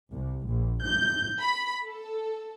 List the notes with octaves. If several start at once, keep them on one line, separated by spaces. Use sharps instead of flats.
C2
A#1
G6
B5
A4